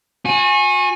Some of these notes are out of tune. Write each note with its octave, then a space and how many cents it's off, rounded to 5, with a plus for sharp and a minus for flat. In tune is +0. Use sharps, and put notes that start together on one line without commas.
F#4 -35 G#5 +0